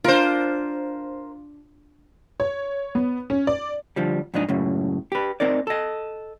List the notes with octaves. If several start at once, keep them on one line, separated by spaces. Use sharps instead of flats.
D4 F4 A#4 C5
C#5
B3
C#4
D5
D3 F3 G3
F2 G#2 D4 D#4
C#2 F#2 A2 C#3
G4 B4
C4 D#4 A#4 D5
A4 D#5